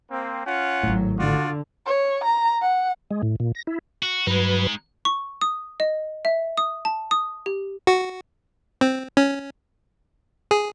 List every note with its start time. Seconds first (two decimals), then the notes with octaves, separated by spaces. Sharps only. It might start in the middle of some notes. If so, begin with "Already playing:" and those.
0.10 A#3 C4
0.46 C#4 F4 F#5
0.83 G#1 A2 F#3
1.18 D3 F4 F#4 D5
1.86 C#5
2.24 A#5
2.62 F#5
3.11 G#3
3.23 A2
3.40 A#2
3.55 A#6
3.67 E4
4.03 F#4
4.27 G2 F#3 G#3 D#4 B4
5.05 C#6
5.41 D#6
5.80 D#5
6.25 E5
6.57 D#6
6.85 A5
7.11 D#6
7.46 G4
7.87 F#4
8.81 C4
9.17 C#4
10.51 G#4